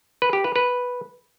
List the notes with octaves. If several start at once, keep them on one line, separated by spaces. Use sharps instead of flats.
B4
G4
B4
B4